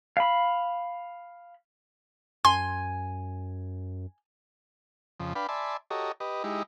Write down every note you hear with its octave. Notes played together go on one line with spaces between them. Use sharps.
F5 B5
F#2 G#5 C6
F2 C#3 F3
D4 B4 F5 G5 B5
D5 E5 G#5 A5 B5 C6
F#4 G4 A4 C#5 D#5 A#5
G4 B4 D#5
G#3 D#4 E4 G4